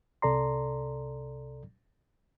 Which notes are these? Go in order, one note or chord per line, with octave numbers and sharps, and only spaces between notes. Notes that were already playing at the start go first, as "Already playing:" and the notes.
C2 C3 A4 D5 A#5 C6